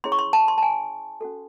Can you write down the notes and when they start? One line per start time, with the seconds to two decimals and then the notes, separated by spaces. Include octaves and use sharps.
0.04 C#4 E4 G#4 C#5 C6
0.12 C#6
0.19 C6
0.33 A5
0.48 C6
0.58 A5
0.63 G#5
1.21 C#4 F#4 A4